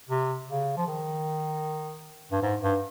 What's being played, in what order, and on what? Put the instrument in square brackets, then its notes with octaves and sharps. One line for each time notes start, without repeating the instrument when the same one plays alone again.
[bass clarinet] C3
C#3
F3
D#3
G2
G#2
G2